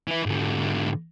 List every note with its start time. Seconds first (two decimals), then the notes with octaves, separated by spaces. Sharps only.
0.08 E3 E4
0.26 G#2 D3